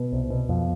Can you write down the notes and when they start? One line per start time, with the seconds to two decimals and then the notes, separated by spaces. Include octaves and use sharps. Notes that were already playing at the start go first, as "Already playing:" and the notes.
Already playing: B2 B3
0.12 C2
0.30 B2
0.49 F2